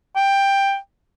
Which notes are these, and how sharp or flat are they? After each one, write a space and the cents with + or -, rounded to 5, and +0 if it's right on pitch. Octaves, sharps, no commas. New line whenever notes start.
G5 +10